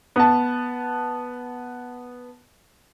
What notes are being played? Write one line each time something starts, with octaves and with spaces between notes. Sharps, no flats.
B3 A5